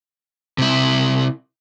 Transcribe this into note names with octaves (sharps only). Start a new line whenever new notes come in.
C3 E4